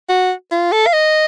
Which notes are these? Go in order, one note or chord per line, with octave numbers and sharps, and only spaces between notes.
F#4
F4
A4
F5
D#5